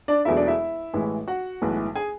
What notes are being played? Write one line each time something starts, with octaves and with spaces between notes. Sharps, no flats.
D4 D5
E1 E2 B2 F#3 A3 E4 E5
D4 D5
E4 E5
A1 A2 E3 G#3
F#4 F#5
B1 A2 E3 G#3
G#4 G#5